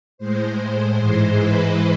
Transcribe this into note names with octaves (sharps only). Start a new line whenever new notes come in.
A2 G#3 C5
G#2 E3 G#3 C5
B4